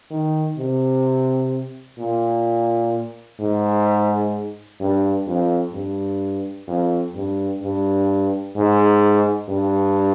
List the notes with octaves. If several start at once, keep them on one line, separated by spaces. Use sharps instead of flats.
D#3
C3
A#2
G#2
G2
F2
G2
F2
G2
G2
G#2
G2